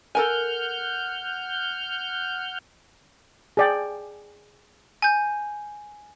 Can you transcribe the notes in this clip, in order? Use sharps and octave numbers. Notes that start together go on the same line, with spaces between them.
A4 A#4 F#5 G#5 F6 G6
G#4 D5 G5
G#5 G6